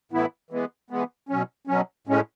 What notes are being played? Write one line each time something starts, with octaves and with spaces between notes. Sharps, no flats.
A2 E3 B3 E4
E3 G#3 B3
E3 G#3 B3
B2 F#3 C#4
B2 F#3 C#4
A2 G#3 C#4